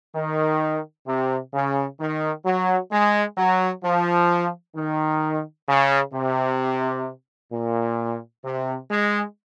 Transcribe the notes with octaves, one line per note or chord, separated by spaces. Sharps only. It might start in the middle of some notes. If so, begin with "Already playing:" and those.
D#3
C3
C#3
D#3
F#3
G#3
F#3
F3
D#3
C#3
C3
A#2
C3
G#3